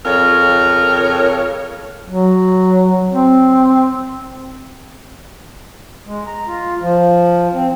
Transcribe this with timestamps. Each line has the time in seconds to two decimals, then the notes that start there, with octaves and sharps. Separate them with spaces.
0.06 F2 C#3 A#4 C#5
2.06 F#3
3.10 C4
6.07 G#3
6.27 A#5
6.47 F4
6.81 F3
7.54 C4